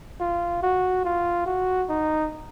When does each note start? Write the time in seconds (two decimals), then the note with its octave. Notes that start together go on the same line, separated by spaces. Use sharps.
0.20 F4
0.63 F#4
1.04 F4
1.46 F#4
1.89 D#4